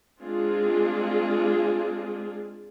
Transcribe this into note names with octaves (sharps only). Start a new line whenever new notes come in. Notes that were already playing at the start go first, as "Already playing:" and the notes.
G#3 C4 D4 F4 G#4